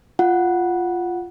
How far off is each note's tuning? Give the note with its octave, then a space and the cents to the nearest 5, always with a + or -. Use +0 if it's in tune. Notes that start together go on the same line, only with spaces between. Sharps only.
F4 +0 F#5 +0